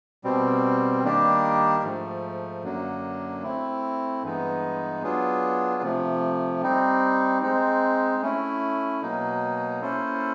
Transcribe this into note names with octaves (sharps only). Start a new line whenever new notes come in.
B2 G3 C4
D#3 G3 A#3 D4 G4
G#2 F3 A3
F#2 D3 F#3 A#3 D4
A3 C4 E4
G2 E3 G#3 B3 D#4
F#3 B3 D4 F4 G#4
C3 F3 A3
G3 C4 D#4
G#3 C4 D#4
A3 C#4 E4
B2 F#3 A#3 D#4
A#3 C#4 E4 A4 C5